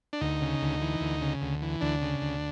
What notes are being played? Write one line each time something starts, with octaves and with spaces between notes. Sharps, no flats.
D4
D2 D#4
C#3
D2
E3
D2
C#3
D2
E3
D2 D4
C#3
D2